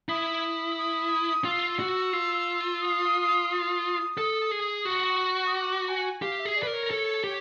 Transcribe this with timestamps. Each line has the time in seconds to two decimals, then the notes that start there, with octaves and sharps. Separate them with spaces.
0.09 E4 D#6
0.77 D#6
1.45 F4 E6
1.80 F#4
2.13 F4
2.81 D#6
3.50 D#6
4.18 A4
4.51 G#4
4.85 F#4
5.46 D#6
5.54 D6
5.88 G#5
6.22 G4 F5
6.39 E5
6.45 G#4
6.56 D5
6.63 B4
6.67 A#4
6.73 C#5
6.91 A4
7.24 G4